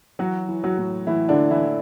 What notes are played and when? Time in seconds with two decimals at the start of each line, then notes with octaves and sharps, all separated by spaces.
0.19 E3 F#3 F#4
0.49 E3
0.64 F#3 F#4
0.78 A2
1.07 A2 E3 E4
1.29 D3 D4
1.37 E3
1.51 E3 E4
1.66 E3